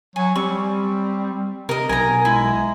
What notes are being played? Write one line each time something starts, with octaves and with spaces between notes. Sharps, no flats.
F#3 G#5
G3 C4 C#6
C3 A#4 D#5
B1 A#4 G#5 A#5
G#3 E4